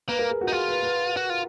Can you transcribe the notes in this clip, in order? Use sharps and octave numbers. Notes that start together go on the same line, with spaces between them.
A#3 B4
A#4
G#4
F#4
D#4
F4 G#4
B4
B4
F#4
F4